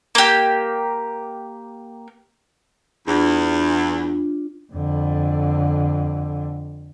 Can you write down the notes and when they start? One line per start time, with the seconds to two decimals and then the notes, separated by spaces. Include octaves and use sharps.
0.15 A#3 G4
3.07 E2 D4 F4
4.73 F2 D3